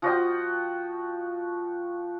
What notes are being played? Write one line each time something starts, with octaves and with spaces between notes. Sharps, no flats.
F3 F#4 D#5 G5